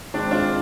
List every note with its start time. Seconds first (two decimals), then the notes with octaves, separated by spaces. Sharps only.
0.14 G#2 D#3 G#3 C4 D4
0.31 D4 F4